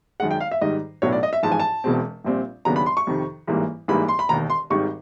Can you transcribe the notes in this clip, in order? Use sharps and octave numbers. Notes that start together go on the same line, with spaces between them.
F#2 D#3 G#3 F#5
G5
F5
E5
G#2 D#3 G3 D#5
B1 A2 F#3 B3 D4 C#5
D5
D#5
E5
A1 G#2 F3 A5
G#5
A5
E1 E2 B2 G#3 C4
A#1 A#2 G3 C4
D#2 C#3 F#3 B3 D4 A#5
B5
C6
C#6
F2 C3 D#3
A1 G#2 E3 G3 A#3
A1 G#2 E3 G3 A#3 B5
C6
B5
E1 D#2 D#3 A#5
C6
G#1 G#2 D#3 G3 C#6